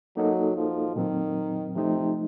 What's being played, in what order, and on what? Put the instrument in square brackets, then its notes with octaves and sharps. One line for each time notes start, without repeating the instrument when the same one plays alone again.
[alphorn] F#3 [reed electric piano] A#3 D#4 F#4 A4 D#5
[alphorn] F3
[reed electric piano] A#2 F#3 C4 [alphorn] D#3
[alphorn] C3 [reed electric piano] F3 A3 D#4